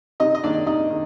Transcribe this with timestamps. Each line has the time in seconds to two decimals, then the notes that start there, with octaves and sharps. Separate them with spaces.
0.20 C3 D#4 D#5
0.35 D#5
0.44 D#3 A#3 D4 D5
0.66 C3 D#4 D#5
0.90 D#3